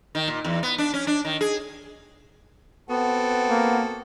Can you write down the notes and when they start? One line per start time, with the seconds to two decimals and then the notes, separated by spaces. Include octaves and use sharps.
0.15 D#3
0.28 A#2
0.45 E2
0.63 B3
0.78 D4
0.94 C#4
1.07 D4
1.25 D#3
1.41 G#4
2.89 B3 C4 F#4 A4
3.50 A#3